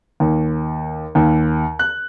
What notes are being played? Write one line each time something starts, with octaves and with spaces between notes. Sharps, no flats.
D#2
D#2
F#6